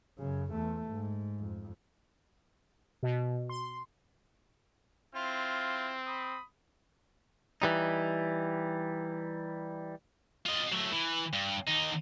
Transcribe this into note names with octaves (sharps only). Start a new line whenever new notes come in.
F#2 C#3
E2 A3
G#2
F2
B2
C6
C4 E4 F4 F6
B5 D#6
E3 G3 D#4
F4 D#5
F#3 A3
E3
G2
D#2 D#4